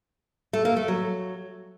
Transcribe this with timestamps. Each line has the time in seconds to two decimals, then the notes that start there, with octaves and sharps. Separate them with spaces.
0.53 A3
0.65 A#3
0.77 A3
0.88 F#3